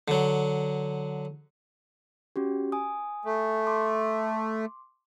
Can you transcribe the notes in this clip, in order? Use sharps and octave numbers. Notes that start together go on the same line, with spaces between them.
D3 F#3
C#4 F#4 G4
G#5 D#6
A3
C6 D6